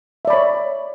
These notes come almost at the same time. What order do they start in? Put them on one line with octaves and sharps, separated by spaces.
E5 D5 B5 C#5